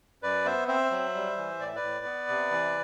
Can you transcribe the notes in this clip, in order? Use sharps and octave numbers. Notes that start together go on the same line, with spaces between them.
F#2 B4 D5
B3 C5 E5
C4 C5 E5
F#3
G3
E3
A2 D5
E5
B4 D5
A2
B3
C3
E3